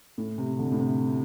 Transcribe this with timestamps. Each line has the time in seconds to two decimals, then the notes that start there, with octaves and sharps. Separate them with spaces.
0.18 A2
0.38 C3
0.59 D3
0.72 A2
0.79 C3